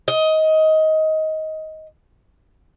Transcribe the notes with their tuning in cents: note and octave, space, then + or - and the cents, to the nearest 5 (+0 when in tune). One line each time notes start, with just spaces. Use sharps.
D#5 +15